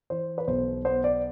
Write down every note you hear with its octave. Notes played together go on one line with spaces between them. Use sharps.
E3 C5
B4
B1 C5
B3 C5
D5